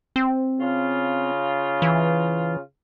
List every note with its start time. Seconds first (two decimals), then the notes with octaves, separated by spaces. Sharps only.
0.16 C4
0.60 C#3 F4
1.82 E3